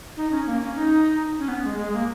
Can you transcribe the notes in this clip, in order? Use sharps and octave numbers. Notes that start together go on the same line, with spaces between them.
D#4
C#4
A#3
C#4
D#4
C#4
B3
G#3
G#3
A#3